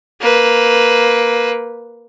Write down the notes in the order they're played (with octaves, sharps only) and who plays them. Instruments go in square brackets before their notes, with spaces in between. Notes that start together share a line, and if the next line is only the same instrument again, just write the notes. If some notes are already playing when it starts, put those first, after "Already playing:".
[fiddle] A#3 B4